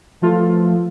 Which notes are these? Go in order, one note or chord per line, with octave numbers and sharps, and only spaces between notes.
E3 F3 A3 F4 A4